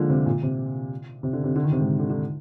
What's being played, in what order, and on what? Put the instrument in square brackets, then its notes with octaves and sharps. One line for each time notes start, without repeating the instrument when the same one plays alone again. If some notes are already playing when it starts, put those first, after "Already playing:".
Already playing: [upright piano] D3 F3 G#3 A#3
C3
A#2
C3
C3
D3
C3
D3
D#3
C3
G#2
D3
D3